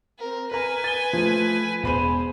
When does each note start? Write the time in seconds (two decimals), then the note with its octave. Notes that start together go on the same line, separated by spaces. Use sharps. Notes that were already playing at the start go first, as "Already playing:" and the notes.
0.19 C4 A#4
0.51 A#4 B4 G#5 A#5
0.84 A6 G7
1.13 F3 A3
1.83 E1 G#3 C5 B5 D#7